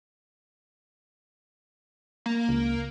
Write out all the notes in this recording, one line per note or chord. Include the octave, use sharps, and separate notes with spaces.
A#3
C#2